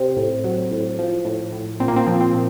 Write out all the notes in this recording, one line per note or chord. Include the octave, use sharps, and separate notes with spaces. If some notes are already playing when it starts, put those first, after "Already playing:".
Already playing: C3 C4
A2
F#3
A2
F3
A2
A2
A#2 C4
A#3
C4
F3
C4
A#2